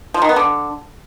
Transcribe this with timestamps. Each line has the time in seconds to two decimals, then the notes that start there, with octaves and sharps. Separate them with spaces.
0.14 F3
0.22 D#3
0.29 B3
0.36 D3